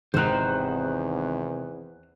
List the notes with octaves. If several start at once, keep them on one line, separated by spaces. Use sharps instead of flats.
G#1 E2 C3 D#3 C5 A#5 F#6